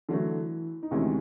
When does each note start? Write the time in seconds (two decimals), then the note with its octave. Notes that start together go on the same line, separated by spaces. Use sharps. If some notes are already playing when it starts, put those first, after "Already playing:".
0.09 D3 E3 F#3 A3 E4
0.83 D#4
0.91 D2 C3 D#3 E3 G#3 C#4 E4